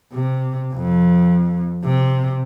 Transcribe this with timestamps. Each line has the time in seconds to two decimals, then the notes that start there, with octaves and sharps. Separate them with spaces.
0.13 C3
0.74 F2
1.84 C3